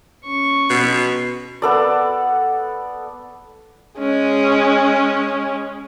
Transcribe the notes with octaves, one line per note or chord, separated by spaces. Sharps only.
C#4 C#6
B2
B3 A4 D5
G#3 C#4